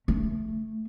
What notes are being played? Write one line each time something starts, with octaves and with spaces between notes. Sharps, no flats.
A3